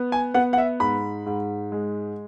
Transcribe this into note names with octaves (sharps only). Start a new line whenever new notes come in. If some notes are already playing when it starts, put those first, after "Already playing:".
Already playing: B3
G#5
B3 F#5
F#5
E5
G#2 B5
G#2
G#3